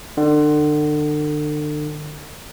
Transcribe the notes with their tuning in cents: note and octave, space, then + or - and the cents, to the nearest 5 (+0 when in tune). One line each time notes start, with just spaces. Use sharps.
D3 +35